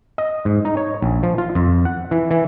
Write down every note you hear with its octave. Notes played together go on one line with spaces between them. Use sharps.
D#5
G#2
D#4
C#5
A#1
F3
F4
F2
F#5
E3
E3